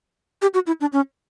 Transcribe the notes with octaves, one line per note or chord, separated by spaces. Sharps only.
G4
F#4
E4
D4
C#4